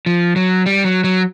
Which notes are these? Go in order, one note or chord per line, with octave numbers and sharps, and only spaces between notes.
F3
F#3
G3
F#3
F#3